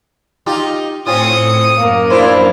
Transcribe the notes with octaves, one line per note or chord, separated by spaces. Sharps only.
D#4 F4 G4
A2 C4 C#4 F4 D#6 C#7
F#2 A#3
F3 D4 E4 C5